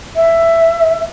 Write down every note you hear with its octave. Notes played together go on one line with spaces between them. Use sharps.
E5